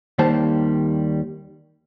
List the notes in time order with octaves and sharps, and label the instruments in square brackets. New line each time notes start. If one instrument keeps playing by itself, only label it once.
[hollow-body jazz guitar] D#2 D#3 G3 A#3 C5 A5